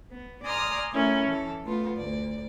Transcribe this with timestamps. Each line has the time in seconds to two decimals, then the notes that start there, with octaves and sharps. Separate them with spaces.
0.12 B3
0.44 D5 G#5 A#5 C6 D#6 F6
0.92 A3 C#4 E4 A#4
1.26 E3 A4
1.64 A3 B3 F4
1.97 D2 D5